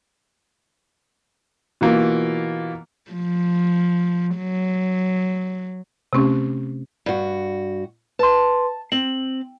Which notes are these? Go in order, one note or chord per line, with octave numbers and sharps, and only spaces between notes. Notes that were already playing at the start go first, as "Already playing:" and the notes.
B2 E3 A#3 F4
F3
F#3
C3 A3 C4 C#4 G4
G2 F#4
B4 A5 C6
C4 F#7